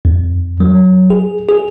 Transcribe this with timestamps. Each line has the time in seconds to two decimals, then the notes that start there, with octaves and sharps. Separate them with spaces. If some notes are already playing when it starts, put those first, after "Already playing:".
0.05 F2
0.60 F#3
1.10 G#4
1.49 G#4